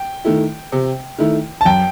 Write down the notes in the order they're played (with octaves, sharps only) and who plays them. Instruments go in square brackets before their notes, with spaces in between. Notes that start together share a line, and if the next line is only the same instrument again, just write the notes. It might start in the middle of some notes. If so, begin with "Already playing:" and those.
Already playing: [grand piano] G5
[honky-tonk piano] D#3 A3 E4
C3
D#3 A3 E4
[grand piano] A5
[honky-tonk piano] F#2 [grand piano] G5